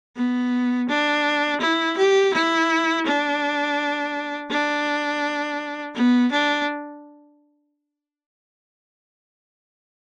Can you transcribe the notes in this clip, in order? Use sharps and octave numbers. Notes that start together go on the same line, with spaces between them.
B3
D4
E4
G4
E4
D4
D4
B3
D4